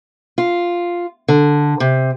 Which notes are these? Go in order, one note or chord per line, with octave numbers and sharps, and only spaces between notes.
F4
D3
C3